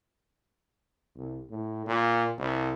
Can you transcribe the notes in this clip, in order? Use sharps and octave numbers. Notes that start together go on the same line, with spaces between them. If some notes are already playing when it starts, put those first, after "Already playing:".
C2
A2
A#2
C2